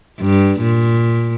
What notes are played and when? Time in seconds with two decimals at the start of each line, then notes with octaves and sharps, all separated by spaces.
0.21 G2
0.60 A#2